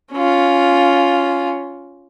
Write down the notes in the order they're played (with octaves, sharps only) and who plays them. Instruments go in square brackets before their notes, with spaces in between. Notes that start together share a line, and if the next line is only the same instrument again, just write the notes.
[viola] C#4 F4